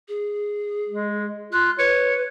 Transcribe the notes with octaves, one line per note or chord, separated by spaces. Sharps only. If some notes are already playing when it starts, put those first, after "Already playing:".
G#4
G#3
F4 F#6
B4 C#5